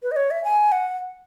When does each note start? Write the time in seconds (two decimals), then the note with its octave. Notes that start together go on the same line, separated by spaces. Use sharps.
0.03 B4
0.11 D#5
0.16 C#5
0.31 E5
0.44 G#5
0.72 F#5